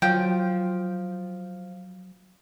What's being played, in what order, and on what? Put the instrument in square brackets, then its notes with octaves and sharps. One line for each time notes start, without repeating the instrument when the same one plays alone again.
[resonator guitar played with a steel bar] F3 [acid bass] F#3 [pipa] G5